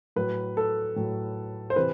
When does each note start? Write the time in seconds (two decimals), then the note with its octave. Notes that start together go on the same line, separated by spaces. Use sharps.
0.16 A2 F#3 B4
0.57 A4
0.96 A2 F#3
1.70 C5
1.76 C3 E3 B4